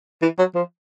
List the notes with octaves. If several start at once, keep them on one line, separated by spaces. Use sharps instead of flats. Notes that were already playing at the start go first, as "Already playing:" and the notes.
E3
F#3
F3